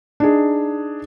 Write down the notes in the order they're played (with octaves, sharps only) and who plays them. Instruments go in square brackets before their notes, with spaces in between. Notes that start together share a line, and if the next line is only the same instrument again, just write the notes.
[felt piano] D4 D#4 G#4